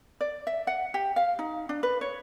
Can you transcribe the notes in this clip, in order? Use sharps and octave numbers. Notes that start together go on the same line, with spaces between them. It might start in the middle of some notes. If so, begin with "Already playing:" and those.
D5
E5
F#5
G4
F5
D#4
D4
B4
C#5